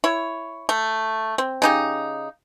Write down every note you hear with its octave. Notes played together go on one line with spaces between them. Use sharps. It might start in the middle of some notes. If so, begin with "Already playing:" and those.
E4 C#5
A3
C4
C#3 D#4 G4